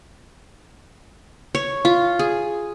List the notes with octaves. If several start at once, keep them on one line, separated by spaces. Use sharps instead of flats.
C#5
F4
G#4